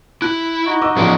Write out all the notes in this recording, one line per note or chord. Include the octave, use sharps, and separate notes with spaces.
E4 F#6
D#4 F#4
D#5 D6 E6
A1 F3 C#4 G#4